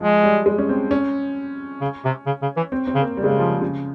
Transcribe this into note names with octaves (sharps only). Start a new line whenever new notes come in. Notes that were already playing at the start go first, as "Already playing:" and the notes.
F3 G#3
G3
G#3
C#4
C4
C#4
C#3
C3
C#3
C#3
E3
C4
C4
C#3
A#3
C#3 G3
G#3
G3
F3
C#3